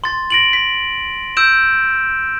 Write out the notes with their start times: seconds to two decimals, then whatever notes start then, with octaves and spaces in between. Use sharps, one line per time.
0.04 C6 A6
0.30 A#6 D7 F#7
0.53 B6
1.37 E6 G6 D7 E7